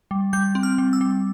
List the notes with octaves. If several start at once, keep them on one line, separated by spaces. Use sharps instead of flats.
G3
G3 G6
C4
F6
G3
E6
G3